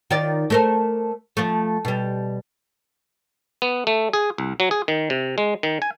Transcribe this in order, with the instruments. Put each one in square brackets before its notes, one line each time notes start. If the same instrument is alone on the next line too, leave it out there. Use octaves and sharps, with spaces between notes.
[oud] D#3 F4 D5
A3 A#4 C5
F3 A3
B2 G3
[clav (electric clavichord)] B3
A3
G#4
C2
F#3
G#4
D#3
C3
G#3
D#3
G#5